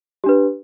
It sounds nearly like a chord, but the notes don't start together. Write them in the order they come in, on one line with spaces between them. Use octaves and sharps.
G4 D4 B4